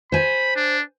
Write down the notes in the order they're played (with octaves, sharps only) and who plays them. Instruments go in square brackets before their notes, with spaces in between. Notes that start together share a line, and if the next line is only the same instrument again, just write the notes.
[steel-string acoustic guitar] C5 G#5 [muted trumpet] B5
[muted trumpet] D4